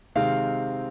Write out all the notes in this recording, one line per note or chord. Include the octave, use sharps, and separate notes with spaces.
C3 D#3 G#3 C4 F5